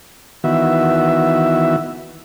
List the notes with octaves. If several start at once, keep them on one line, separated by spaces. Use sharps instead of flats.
D#3 E3 B3 F#4 E5